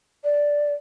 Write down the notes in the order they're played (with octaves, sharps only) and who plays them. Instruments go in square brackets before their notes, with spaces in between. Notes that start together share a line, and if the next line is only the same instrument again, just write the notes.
[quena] D5